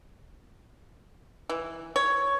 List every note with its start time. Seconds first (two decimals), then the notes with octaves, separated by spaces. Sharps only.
1.49 E3
1.96 C#5